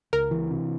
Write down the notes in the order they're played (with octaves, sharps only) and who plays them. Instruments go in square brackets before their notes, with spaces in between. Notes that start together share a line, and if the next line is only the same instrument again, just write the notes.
[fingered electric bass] C#2 [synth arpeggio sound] A#4
[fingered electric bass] E3
C3